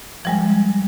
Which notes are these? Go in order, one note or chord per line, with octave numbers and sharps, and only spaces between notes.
F3 G3 G#3